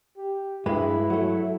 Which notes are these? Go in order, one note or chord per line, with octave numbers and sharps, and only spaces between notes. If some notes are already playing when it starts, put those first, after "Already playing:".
G4
G2 G#3 E4 B4
F#3 A3